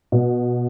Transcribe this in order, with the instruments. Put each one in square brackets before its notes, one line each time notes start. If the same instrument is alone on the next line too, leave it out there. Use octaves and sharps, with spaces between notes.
[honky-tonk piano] B2